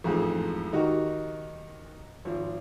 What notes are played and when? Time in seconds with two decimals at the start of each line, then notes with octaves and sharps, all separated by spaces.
0.04 A1 F2 G#2 G#4
0.73 D#3 D#4 F#4 G4
2.25 G#1 F3